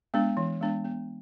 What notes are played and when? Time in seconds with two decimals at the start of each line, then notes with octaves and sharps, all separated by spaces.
0.14 G#3 B3 D4
0.37 E3
0.61 G#3 B3 D4
0.85 B3